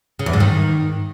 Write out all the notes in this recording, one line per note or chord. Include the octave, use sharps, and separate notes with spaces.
C#3
E2
G#2
D#3